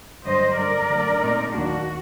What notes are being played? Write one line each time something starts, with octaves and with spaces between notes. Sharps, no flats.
G2 D3 F#3 C5 D#5
F#2 D3 G3 A#4 D5
D2 D3 F#3
A#2 A3 C4 D#4
D#2 D#3 F#3 A#3 D4 F#4